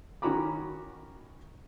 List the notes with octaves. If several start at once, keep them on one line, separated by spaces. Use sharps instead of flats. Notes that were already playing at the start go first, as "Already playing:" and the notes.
D#3 C#4 F#4 A#5 B5 D6